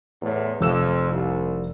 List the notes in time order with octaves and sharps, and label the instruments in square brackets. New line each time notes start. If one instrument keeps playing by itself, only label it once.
[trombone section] E2 A2
[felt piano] F1 E6 E7 [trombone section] F2
[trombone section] C2